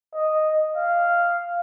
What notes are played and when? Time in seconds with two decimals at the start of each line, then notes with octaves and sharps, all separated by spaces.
0.15 D#5
0.77 F5